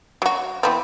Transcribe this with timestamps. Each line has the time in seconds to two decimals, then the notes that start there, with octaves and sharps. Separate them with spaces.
0.22 F#3 F#4
0.63 E3 B3 C4